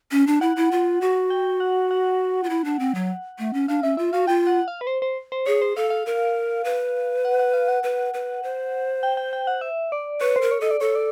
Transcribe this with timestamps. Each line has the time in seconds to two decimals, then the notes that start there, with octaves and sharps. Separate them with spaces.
0.12 C#4
0.27 D4
0.41 E4 F#5
0.56 E4
0.71 F4
1.01 F#4
1.30 G5
1.60 F#5
1.91 F#5
2.43 F4
2.50 E4
2.65 D4
2.79 C4
2.95 F#3
3.39 A3
3.53 C#4
3.68 D4 F5
3.83 C#4 E5
3.97 F4 E5
4.13 F#4 F5
4.27 F4 G5
4.47 F#5
4.68 F5
4.81 B4
4.87 C5
5.02 C5
5.32 C5
5.46 G#4 C#5
5.62 C5
5.76 A4 F5
5.90 F5
6.06 A#4
6.64 B4
7.25 F#5
7.39 F#5
7.54 F5
7.68 F#5
7.83 B4
8.14 B4
8.43 C5
9.03 G5
9.17 G5
9.33 G5
9.47 F#5
9.61 E5
9.92 D5
10.21 B4 C#5
10.36 C5
10.41 A#4
10.51 C#5
10.61 A4 D#5
10.71 D5
10.80 A4 C#5
10.95 D5